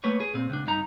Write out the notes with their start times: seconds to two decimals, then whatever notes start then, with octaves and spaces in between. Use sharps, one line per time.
0.04 A3 A#3 B4 C#5
0.20 G#4
0.34 A#2 C4
0.50 C#2 D4
0.67 G2 D#4 A#5